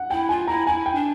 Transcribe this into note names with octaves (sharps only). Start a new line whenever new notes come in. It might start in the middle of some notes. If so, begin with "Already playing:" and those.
Already playing: F#5
E4 G5
F4 G#5
E4 A#5
E4 G#5
G5
D4